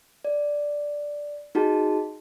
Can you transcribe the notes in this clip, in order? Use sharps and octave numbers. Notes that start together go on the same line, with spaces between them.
D5
D#4 F#4 G#4 A5